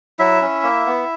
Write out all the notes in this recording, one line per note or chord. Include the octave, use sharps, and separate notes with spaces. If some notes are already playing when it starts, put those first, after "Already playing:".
F#3 E4 E5
C#4
A#3
B3